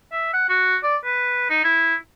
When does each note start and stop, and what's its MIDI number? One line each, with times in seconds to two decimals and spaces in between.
0.12 0.33 76
0.33 0.47 78
0.49 0.76 66
0.83 0.97 74
1.04 1.48 71
1.50 1.62 63
1.64 1.95 64